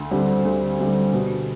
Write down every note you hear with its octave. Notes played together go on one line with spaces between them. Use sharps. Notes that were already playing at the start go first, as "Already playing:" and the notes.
Already playing: D2
D3 G3 C4
D2
D3 G3 C4
B2